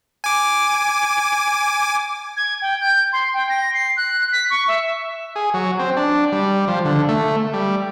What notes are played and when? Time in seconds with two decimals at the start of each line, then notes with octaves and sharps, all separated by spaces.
0.24 G#5 D6
2.36 G#6
2.62 G5
2.81 G6
3.13 C6
3.34 G5
3.49 A#6
3.74 C7
3.97 F#6
4.32 B6
4.50 C#6
4.68 E5
5.36 G#4
5.54 F#3
5.79 C4
5.97 D4
6.32 G3
6.68 F3
6.85 D3
7.09 A3
7.53 G3